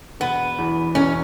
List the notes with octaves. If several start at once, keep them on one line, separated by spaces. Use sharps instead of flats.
E1 B3
E2 E3
E1 C#4